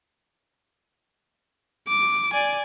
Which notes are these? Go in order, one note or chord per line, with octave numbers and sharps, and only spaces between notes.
D6
D5 G#5